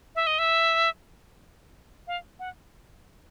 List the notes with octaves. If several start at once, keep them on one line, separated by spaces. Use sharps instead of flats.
E5
D#5
E5
F5
F#5